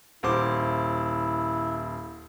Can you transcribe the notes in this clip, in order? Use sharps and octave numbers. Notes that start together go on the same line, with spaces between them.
D#1 E4 C5 D6